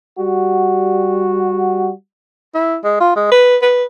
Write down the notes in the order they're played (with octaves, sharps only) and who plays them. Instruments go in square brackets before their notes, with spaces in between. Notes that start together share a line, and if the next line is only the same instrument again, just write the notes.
[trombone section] G3 F#4
[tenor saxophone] E4
G#3
F4
G#3
B4
B4